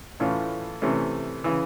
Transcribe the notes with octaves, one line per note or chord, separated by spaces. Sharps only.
A2 E3 A3 C#4 F4
C3 E3 A3 C#4
C#3 E3